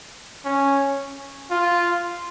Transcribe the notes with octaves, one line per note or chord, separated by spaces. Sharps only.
C#4
F4